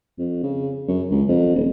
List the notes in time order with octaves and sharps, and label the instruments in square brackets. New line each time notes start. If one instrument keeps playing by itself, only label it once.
[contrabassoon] F2
C#3
F#2
C#2
F2
D#1